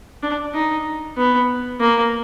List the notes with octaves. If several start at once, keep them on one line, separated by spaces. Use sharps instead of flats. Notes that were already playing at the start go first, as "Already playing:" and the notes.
D4
D#4
B3
A#3